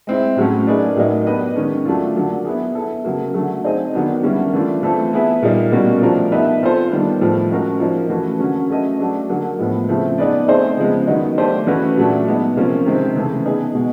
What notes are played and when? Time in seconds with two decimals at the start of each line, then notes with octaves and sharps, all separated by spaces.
0.07 G#3 C4 E4
0.37 A2 F#3 A3 C#4
0.67 A#3 D#4 G#4 B4 D5
0.96 A2 F#3 A#3 D#4
1.26 B3 D4 G4 B4 D#5
1.56 D#3 G#3 C#4
1.85 F#3 A3 D4 F4
2.15 D3 F#3 A#3 D4
2.45 B3 E4 G#4
2.75 B3 E4 A4
3.04 C#3 F#3 A#3
3.34 D3 F#3 A3
3.64 C4 D#4 G#4 C5 D#5
3.94 D#3 F#3 B3 D4
4.23 D3 G3 A#3 C#4 E4
4.53 E3 A3 D4 F4
4.83 E3 A3 C4 F4 A4
5.13 B3 E4 G#4 B4 E5
5.42 A#2 G3 A#3 D#4
5.72 B2 G3 A#3 C#4 F#4
6.02 F3 A3 D4 F4 A#4
6.32 B3 D#4 G4 B4 E5
6.62 C4 F4 A4 C5
6.91 D#3 G3 B3 D4
7.21 A2 F3 A3
7.50 G#3 C#4 F#4 A#4
7.80 F3 A#3 D#4
8.10 E3 A3 C#4 F#4
8.39 D3 F#3 A#3 C#4
8.70 A3 C#4 F#4 B4 D#5
9.00 F#3 A3 D4
9.29 D3 F#3 A#3
9.59 A2 F3 G#3 B3
9.88 C#3 F3 A3 C4 E4
10.18 B3 D#4 G#4 B4 D5
10.48 A3 C4 D#4 G#4 C5
10.77 C#3 F3 G#3 B3
11.07 D#3 F#3 B3 D#4
11.37 A3 D4 G4 C5 D#5
11.67 E3 A3 C#4 F#4 B4
11.97 A#2 F#3 A3 D4
12.26 G#3 B3 D#4
12.56 C3 F3 A#3 C#4 F4
12.86 C3 D#3 G#3 C4
13.15 C#3 E3 A3
13.45 B3 D#4 G#4
13.75 B2 G#3